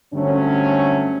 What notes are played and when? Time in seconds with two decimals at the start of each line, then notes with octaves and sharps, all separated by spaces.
0.13 G2 D3 F#3 A3 C4 C#4